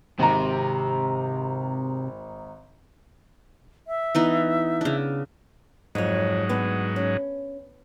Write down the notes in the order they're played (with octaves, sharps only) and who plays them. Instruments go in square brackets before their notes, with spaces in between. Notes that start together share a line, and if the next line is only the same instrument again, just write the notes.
[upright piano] G#1 A#5 [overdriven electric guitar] C3
[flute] E5
[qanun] E3 B3 D#4
C#3 D4
[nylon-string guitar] F2 C#5 [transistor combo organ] G#2 F#3 D#4
[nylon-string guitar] B3 D4
C#4